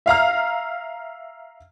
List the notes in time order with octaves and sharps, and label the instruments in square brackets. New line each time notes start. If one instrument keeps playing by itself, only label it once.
[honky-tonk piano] E5 F5 A#5 F6